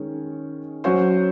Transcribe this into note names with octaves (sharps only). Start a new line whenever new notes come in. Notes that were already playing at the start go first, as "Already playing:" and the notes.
Already playing: D#3 G#3 C#4
F#3 C#4 F#4 C5